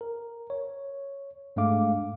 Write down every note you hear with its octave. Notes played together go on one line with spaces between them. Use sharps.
A#4
C#5
G#2 G#3 A3 D4 F5 D6